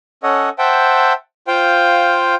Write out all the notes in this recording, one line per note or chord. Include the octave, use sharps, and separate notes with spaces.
C#4 A4 C#5 D#5 F#5
C5 E5 F#5 G5 A5
F4 C5 F5 G5